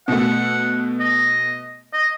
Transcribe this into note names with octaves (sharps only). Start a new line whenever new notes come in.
B2 A3 F#5
D#5
D#5